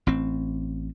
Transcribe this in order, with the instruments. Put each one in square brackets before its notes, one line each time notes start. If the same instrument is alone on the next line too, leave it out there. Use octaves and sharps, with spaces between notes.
[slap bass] A1 C4